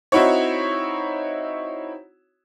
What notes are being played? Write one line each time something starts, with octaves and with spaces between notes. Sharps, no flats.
C4 D#4 E4 F#4 C#5